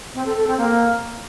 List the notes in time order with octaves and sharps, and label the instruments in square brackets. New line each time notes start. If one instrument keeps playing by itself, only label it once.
[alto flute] C4
A4
A4
C4
A#3